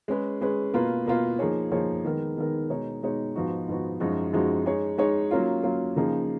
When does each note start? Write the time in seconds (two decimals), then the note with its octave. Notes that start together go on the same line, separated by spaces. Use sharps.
0.08 G#3 C#4 G#4 B4
0.41 G#3 C#4 G#4 B4
0.73 B2 A#3 F4 B4
1.06 B2 A#3 F4 B4
1.39 F3 A#3 D#4 G#4 C#5
1.71 F3 A#3 D#4 G#4 C#5
2.04 D#3 G#3 B3 D#4 A#4
2.37 D#3 G#3 B3 D#4 A#4
2.69 B2 G#3 D#4 G#4 C#5
3.02 B2 G#3 D#4 G#4 C#5
3.35 G#2 F3 B3 D#4 F#4
3.68 G#2 F3 B3 D#4 F#4
4.00 F#2 F3 G#3 D#4 F#4
4.33 F#2 F3 G#3 D#4 F#4
4.66 G#3 D#4 G#4 C#5
4.98 G#3 D#4 G#4 C#5
5.31 F#3 A#3 C#4 F4
5.63 F#3 A#3 C#4 F4
5.96 C#3 F3 A#3 D#4 G#4